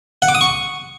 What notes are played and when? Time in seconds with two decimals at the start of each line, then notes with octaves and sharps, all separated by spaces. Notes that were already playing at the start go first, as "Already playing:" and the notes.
0.22 F#5
0.28 D6
0.35 D#6
0.41 C#6